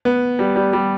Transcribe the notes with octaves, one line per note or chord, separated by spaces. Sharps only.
B3
G3
G3
G3